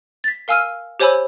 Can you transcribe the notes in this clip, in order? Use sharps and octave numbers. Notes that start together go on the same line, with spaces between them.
A6 B6
A#4 F5 G#5 E6 F6 D#7
G4 C5 C#5 G#5 B5 E6